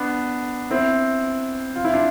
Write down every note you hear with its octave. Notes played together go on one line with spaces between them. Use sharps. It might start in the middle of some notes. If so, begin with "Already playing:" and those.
Already playing: B3 D4
C4 E4
F4
E4
D4 F4